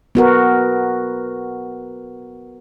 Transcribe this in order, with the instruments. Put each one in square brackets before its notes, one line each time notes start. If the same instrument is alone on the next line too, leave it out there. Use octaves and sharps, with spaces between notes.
[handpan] B3 F#4 A#4